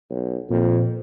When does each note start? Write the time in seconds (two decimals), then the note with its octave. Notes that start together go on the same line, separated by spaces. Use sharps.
0.10 B1
0.50 F2 A#2